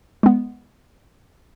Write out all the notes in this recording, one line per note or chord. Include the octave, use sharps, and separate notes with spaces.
G#3 B3